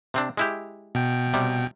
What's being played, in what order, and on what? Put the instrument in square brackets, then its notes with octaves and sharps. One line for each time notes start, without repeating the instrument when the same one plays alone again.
[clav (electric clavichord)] C3 C4 D4
G#3 E4 G4
[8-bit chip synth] B2 G5
[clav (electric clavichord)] C3 G3